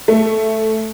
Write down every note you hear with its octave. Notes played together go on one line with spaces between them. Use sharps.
A3